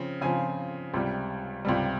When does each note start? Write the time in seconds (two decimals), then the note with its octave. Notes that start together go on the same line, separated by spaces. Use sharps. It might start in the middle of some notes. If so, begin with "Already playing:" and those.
Already playing: C#3 F3 C4
0.21 C#3 F3 C4 F4 G#5
0.94 C#2 C3 G3
1.65 C#2 C3 G3